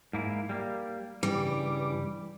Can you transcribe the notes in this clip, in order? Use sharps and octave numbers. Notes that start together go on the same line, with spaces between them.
G#2 A#3 E4
G3 A#3
G2 C#3 E3 G3 D6